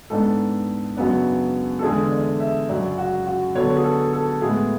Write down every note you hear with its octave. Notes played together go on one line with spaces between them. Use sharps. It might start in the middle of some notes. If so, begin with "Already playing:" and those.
G#2 G#3 B3 D4 A4
F#2 C#3 F#3 B3 D4
A4
E2 D3 G#3 D4 G#4
D5
E5
F#2 C#3 F#3 D5
F#4
F#4
D3 F#3 B3 D4 C#5
G#4
A4
A4
A2 G#3 B3 G#4